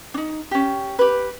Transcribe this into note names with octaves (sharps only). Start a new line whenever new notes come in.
D4 D#4
C#4 G4
G4 B4